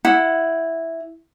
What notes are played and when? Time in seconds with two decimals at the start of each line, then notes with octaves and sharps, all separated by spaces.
0.05 E4 F#5